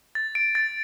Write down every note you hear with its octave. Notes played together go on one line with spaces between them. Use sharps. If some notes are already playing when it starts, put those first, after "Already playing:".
A6
D7
A6